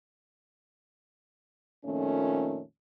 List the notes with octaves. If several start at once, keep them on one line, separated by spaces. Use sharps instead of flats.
F2 A#2 D#3 A3 C#4